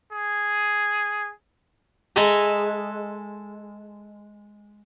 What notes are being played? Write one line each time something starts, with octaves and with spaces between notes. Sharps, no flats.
G#4
G#3 A4 E5 G#5 A#5